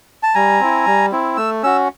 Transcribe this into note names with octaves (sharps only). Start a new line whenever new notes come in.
A5
G3 G#5 A#5
C4 E4
G3
C4 E4
A3 E6
C#4 F#4 E6